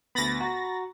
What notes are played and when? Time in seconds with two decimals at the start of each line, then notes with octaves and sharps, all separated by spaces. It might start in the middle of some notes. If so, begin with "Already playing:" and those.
0.15 D2 B3 B5 A6 A#6
0.41 F#4 A#5